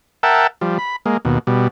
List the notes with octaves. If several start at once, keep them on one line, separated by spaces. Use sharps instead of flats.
A#4 E5 F#5 G5 A5
F3 G3
B5
G#3 A#3
D#2 B2
B2 G3